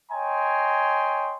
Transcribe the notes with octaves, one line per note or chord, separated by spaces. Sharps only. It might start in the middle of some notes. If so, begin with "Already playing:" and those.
C#5 D#5 G5 G#5 A#5 C6